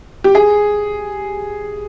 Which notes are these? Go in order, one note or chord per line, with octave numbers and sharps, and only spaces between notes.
G4
G#4